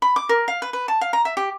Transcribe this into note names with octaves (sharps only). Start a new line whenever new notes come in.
B5
D6
A#4
F5
B4
B4
A5
F5
A#5
E5
G4